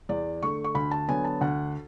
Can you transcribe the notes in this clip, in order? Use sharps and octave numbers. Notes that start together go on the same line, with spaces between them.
E2 D5
D3 A3 C#6
C#6
D2 B5
A5
D3 F#3 B3 G#5
A5
D2 F#5